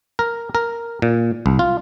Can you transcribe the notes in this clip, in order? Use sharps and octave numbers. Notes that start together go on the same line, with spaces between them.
A#4
A#4
A#2
C2
F4